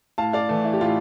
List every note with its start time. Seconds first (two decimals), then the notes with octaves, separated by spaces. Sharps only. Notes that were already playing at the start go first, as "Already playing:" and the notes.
0.18 A2 F5 A5
0.33 D5 F5
0.49 E3 A3
0.65 E4
0.73 G4
0.81 A2 F4